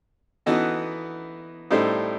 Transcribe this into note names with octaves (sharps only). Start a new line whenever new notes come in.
E3 B3 D#4 F#4 A4
A2 G3 D#4 A4 C5